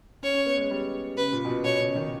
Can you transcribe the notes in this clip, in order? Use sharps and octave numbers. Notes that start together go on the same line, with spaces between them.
C#4 C#5
C#4
B3
G#3
G3
C#3 B4
A#2
B2
A#2
B2 C#5
C#3
D#3